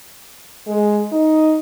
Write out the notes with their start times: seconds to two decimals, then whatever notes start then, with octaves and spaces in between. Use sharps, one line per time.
0.68 G#3
1.12 D#4